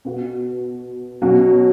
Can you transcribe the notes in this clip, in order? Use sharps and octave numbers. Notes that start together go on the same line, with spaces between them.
B2 B3 F#4
B2 F#3 C#4 F#4